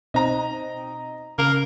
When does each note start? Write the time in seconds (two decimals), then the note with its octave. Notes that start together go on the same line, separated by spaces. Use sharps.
0.14 B2 C4 D#4 D#5 A#5
1.38 C#3 A#4